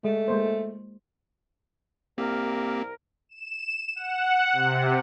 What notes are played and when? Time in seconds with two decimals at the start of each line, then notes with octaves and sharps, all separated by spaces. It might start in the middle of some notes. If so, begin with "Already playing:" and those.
0.04 G#3 A3
0.28 G#3 A#3 C5
2.18 C2 A#3 C4 G4 A#4
3.29 E7
3.96 F#5
4.53 C3